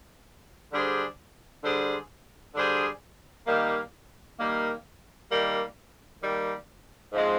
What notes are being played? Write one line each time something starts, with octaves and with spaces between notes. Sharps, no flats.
D3 G3 D4 G#4 C5
D3 G3 D4 G#4 C5
D3 G3 D4 G#4 C5
D#3 G3 A#3
D#3 G3 A#3
D#3 G3 A#3
D#3 G3 A#3
G#2 F3 G#3 C4